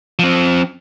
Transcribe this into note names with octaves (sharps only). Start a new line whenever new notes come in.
F3 C4